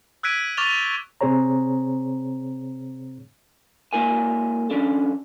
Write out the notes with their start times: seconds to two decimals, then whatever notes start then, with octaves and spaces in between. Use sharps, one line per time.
0.23 E6 F#6 G#6 B6 D7 D#7
0.57 C#6 D6 F6 A6 F7 G7
1.21 C3 C4 G#4 C5 C#5 A#5
3.93 G#3 A#3 E4 A#4 G#5
4.70 F3 C#4 D4 A4